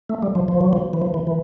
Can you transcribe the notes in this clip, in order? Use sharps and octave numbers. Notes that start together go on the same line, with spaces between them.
A3
G3
F3
F3
F#3
F3
E3
F3
E3
E3